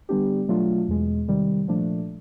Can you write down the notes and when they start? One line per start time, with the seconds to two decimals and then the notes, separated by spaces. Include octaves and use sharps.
0.09 D3 G3 B3 D4 G4
0.48 B2 F#3 A3 D4 F4
0.88 E2 B2 G#3
1.28 C3 D#3 G3
1.68 A#2 F3 A3 D4